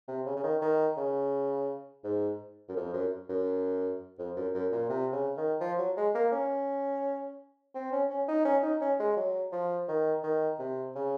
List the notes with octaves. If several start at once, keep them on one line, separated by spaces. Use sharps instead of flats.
C3
C#3
C#3
D#3
D#3
C#3
G#2
F#2
F2
F#2
F#2
F2
F#2
F#2
A#2
C3
C#3
D#3
F3
F#3
G#3
A#3
C#4
C4
C#4
C#4
D#4
C#4
D#4
C#4
G#3
F#3
F3
D#3
D#3
C3
C#3